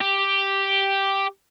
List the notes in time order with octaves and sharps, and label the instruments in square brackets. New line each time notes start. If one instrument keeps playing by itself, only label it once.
[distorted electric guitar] G4